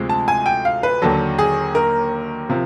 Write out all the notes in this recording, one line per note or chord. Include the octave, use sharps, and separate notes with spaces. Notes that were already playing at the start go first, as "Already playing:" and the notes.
Already playing: D2 C3 F3 G#3
A5
G#5
G5
F5
B4
D#2 D3 F#3 A4
G#4
A#4
C3 F3